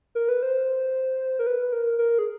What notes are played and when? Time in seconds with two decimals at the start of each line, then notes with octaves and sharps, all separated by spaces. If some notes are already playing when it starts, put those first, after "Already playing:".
0.15 A#4
0.29 B4
0.43 C5
1.39 A#4
1.47 B4
1.72 A#4
1.99 A#4
2.19 G#4